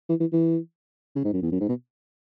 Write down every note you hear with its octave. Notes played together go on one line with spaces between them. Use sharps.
E3
E3
E3
C#3
G#2
F#2
E2
F#2
G#2
B2